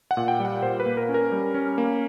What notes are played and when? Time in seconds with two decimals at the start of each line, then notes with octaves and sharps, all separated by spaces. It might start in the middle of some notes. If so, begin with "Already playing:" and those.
0.11 F#5
0.17 A#2
0.28 G5
0.40 G3
0.45 F#5
0.62 A#2 C5
0.80 B4
0.86 A#3
0.97 A#4
1.09 C#4
1.14 A#4
1.32 G3
1.54 C#4
1.78 A#3